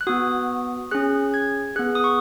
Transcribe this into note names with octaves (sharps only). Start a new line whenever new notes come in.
F#6
B3 F#4 D#6
C#4 G#4 F#6
G#6
B3 G#4 F#6
D#6
C#6